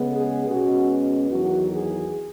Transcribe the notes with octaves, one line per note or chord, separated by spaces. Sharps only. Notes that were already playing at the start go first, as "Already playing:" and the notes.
Already playing: C#3 G#3 B3
G#4
B2 G#3 C#4 F#4
E2 D#3 F#3 F#4
G#4